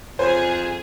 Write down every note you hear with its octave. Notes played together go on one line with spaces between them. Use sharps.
F2 G#4 C5 G#5